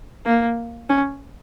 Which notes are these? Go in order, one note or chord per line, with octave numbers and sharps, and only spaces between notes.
A#3
C#4